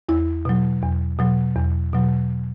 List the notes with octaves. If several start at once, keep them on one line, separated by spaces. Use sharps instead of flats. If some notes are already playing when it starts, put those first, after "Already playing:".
E2 E4
B2 F#3
E2
B2 F#3
E2
B2 F#3